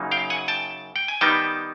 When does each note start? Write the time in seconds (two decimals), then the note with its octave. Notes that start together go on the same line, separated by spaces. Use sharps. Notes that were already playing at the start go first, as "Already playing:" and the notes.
Already playing: F#2 C#3 F#3 A#3 D#4
0.11 F5 G5
0.30 F#5 G#5
0.48 G5 A5
0.96 G5
1.08 G#5
1.21 D#3 G3 B3 D#4 G5 A5